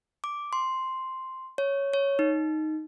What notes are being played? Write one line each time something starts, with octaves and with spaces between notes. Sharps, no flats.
D6
C6
C#5
C#5
D#4